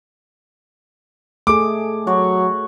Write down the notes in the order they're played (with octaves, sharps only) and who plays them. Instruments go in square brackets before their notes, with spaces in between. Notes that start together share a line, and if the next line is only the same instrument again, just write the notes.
[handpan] A3 G#4 [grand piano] D6
[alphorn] F#3 [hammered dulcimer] F#4 C#5